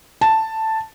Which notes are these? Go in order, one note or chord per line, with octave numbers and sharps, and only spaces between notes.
A5